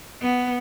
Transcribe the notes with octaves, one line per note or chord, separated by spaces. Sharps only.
B3